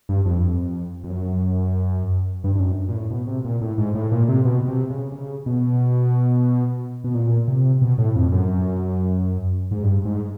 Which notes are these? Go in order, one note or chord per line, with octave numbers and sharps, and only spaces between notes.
G2
F2
F2
F#2
G2
G2
F#2
A#2
A2
B2
C3
A#2
A2
G#2
A2
A#2
C3
B2
C3
C#3
C#3
B2
B2
A#2
C3
B2
A2
F2
F#2
G#2
G2
G#2